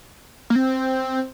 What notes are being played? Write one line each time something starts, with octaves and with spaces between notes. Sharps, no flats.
A#3
C4